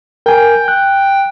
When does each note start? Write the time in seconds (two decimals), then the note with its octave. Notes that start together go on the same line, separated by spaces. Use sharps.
0.26 A#4 G5 G#5
0.68 F#6